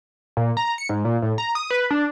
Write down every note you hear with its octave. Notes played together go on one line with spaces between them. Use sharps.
A#2
A#5
C#7
G#2
A#2
A2
A#5
D#6
B4
D4